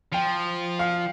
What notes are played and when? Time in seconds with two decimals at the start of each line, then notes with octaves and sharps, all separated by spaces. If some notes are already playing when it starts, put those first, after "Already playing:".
0.13 F3 G5
0.79 F5